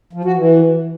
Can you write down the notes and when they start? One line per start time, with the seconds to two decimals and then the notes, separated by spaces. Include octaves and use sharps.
0.13 F3
0.25 F#4
0.36 E3